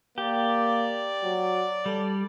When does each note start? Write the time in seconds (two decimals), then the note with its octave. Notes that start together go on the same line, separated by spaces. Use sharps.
0.18 A#3 G4 D5
1.23 F#3
1.86 G3 A4